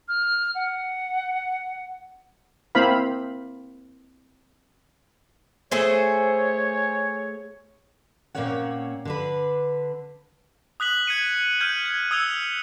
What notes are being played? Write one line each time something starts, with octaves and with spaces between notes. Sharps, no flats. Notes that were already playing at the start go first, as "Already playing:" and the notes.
F6
F#5
A#3 C4 E4 C5 F5 B5
A3 G#4 C5 C#5
A#2 A#3 C4 C#4 C#5 F#5
D3 D4 B4
D#6 F#6 B6 F#7
G#6 B6 C#7 D#7
F6 G6 G#6 D#7
G#6
D#6 E6 G#6 C#7 F7 G7